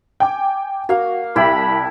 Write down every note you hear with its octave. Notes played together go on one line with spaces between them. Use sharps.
G5 G#5 D6
A#3 F#4 F5
C2 E4 G4 A5 B5